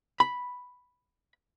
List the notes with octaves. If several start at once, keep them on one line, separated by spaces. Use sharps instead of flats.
B5